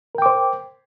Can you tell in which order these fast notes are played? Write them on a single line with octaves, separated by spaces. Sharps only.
A#4 G5 D6 C5